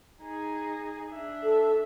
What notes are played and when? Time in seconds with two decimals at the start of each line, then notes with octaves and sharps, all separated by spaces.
0.22 D#4 G#4
1.13 D4 E5
1.43 A4